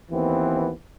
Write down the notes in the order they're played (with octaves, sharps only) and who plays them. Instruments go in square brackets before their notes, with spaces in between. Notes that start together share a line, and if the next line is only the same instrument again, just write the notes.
[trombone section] D#2 E3 B3 C4